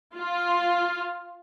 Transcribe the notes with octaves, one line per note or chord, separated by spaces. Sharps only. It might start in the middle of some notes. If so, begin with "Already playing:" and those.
F4